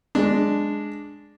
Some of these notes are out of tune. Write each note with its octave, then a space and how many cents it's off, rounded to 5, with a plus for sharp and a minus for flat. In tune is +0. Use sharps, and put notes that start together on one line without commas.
G#3 +0 D4 +0